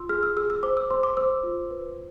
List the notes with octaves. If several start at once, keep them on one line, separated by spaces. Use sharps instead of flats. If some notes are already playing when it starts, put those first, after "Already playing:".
Already playing: F4 C6 E6
G#4 F6
E6
G#4 E6
E6
C5 D6
E6
C5 C6
D6
C5 E6
F4
B4